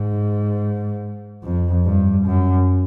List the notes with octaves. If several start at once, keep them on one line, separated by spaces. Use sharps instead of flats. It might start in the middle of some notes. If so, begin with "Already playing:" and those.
Already playing: G#2
F2
G2
F#2